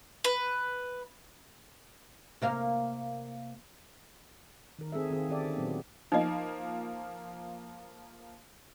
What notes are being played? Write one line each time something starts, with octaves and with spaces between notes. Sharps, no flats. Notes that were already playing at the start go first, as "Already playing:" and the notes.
B4
C3 A#3 F5
D#3 A#4
C4 G#4 A4 E5
D#3 C4 F4 G#4
D#3 C#4 G4 A4 D5 E5
D3
A#2 F#3 B3 C4
F3 A#3 D#4 D#5